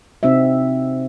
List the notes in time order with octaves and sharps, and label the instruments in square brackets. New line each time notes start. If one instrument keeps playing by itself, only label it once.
[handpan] C3 C4 D#4 F#4 E5